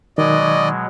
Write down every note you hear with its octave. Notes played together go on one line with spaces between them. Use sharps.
B2 D#3 F#3 G#3 D5 D#5